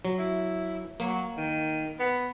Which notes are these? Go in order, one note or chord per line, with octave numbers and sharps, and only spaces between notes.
F#3
E4
F#3 A#3
D#3
B3